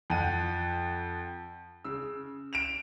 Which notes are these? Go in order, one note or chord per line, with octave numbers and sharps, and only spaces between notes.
F2 F#5 D#7
C#3 E6
D7 E7 F7